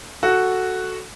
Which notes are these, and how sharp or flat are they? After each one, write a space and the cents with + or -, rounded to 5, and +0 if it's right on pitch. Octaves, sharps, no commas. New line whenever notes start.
F#4 +0 A4 +0